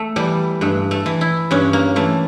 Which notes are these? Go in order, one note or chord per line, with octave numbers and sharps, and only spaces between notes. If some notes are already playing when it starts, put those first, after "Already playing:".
Already playing: A3
E3 G3
G2 A3
A3
E3
E4
G2 C#4
A#3
E3 A3